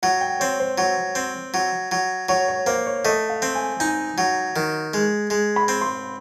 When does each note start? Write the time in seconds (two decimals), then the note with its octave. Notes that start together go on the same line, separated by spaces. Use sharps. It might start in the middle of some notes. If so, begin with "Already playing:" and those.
0.03 F#3 F#5
0.21 G5
0.40 C4 C#5
0.60 C5
0.78 F#3 C#5
1.15 C4
1.54 F#3
1.92 F#3
2.29 F#3 C#5
2.48 C#5
2.66 A#3 C5
2.86 C#5
3.05 A3 D#5
3.30 F5
3.42 C4
3.55 G#5
3.80 D#4 G#5
4.18 F#3
4.56 D#3
4.94 G#3
5.30 G#3
5.56 B5
5.68 C4
5.82 C6